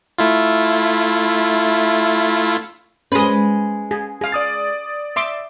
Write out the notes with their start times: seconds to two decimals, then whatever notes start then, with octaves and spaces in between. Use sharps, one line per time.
0.18 A3 E4 F4
3.12 G#3 C#4 B4 C6 D#6
3.91 G#4
4.21 G#4 F5
4.32 D5 D#6 A6
5.16 E5 C6 D6